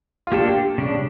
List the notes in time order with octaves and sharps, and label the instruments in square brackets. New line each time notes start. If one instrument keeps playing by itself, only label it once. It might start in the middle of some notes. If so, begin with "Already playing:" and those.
[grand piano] F4
[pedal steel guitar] A#3 D4 A4 [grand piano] G4
[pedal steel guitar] C#3 G3 D4